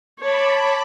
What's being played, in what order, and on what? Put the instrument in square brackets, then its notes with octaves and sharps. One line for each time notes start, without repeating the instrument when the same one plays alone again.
[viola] C#5 [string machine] A5 B5 D6